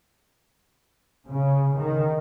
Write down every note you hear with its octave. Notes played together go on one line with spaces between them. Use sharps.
C#3
D#3